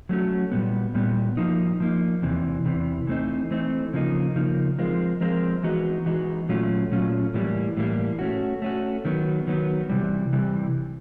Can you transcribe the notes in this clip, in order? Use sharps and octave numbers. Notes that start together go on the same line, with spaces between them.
F#3 A3 C#4 F#4
A#2 G3 B3
A#2 G3 B3
F3 A#3 D#4
F3 A#3 D#4
E2 C3 E3
E2 C3 E3
E3 A3 C4 D#4
E3 A3 C4 D#4
C#3 F3 A#3 D#4
C#3 F3 A#3 D#4
F3 G#3 C4 F4 A#4
F3 G#3 C4 F4 A#4
E3 G#3 B3 D#4 F#4
E3 G#3 B3 D#4 F#4
A#2 F#3 A3 C#4 F4
A#2 F#3 A3 C#4 F4
A2 E3 G3 A#3
A2 E3 G3 A#3
A3 C#4 F#4
A3 C#4 F#4
D#3 F#3 B3
D#3 F#3 B3
C3 E3 G3
C3 E3 G3